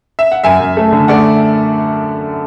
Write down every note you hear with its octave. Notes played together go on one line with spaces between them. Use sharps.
E5
F#5
F#2 E5 G#5
F#2
A3
D3
A3 D5 F#5